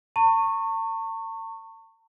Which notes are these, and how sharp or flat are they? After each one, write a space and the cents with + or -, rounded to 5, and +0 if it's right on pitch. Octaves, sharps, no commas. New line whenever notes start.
A5 +45 C#6 -15